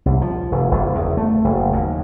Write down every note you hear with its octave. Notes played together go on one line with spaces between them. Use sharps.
C2
F3
F1
F#1
E2
A3
F#1
D#2